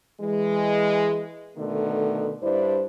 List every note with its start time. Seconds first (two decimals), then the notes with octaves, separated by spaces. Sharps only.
0.21 E3 G#3
1.57 B2 D3 D#3 A3
2.42 G2 D4 E4 C5